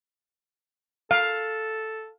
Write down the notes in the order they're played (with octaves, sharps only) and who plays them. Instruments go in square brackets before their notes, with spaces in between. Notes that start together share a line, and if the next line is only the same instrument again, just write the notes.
[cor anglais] A4 [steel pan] F5